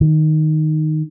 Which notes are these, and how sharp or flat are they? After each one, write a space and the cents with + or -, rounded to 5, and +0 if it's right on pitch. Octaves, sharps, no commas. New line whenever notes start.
D#3 -5